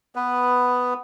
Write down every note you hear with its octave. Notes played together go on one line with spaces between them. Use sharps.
B3 B4